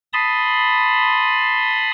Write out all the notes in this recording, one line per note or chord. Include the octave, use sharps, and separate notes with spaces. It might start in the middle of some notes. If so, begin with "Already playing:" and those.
A5 B5 C6 D#6